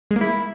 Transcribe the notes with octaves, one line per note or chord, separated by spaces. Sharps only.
G#3
A#3
E4